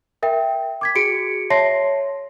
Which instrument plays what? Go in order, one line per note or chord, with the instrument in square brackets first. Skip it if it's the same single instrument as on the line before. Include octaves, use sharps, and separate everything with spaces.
[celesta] A#4 E5 G5
D6 G#6 B6
F#4 G#4 C#7 D7
C#5 E5 A5 C6 A#6 C7